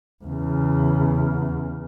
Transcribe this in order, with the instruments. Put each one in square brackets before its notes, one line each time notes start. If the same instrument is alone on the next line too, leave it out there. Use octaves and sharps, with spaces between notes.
[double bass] E2 C#3